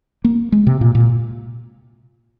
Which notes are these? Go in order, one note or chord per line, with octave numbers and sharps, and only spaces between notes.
A#3
G#3
C3
A#2
A#2